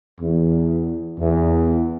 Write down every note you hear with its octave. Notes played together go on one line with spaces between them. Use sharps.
E2
E2